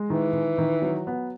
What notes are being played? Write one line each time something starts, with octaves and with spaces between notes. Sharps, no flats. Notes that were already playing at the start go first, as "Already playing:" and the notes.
Already playing: G#3
D#3 E3
D#3
D#3
F#3
B3